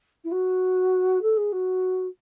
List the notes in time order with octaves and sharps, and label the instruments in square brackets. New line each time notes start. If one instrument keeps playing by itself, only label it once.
[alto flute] E4
F#4
A4
G#4
F#4